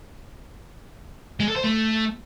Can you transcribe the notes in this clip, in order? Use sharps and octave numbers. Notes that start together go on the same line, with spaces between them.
G#3
A4
C5
A3